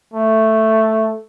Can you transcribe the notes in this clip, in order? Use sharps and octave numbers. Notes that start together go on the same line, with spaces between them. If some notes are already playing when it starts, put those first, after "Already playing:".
A3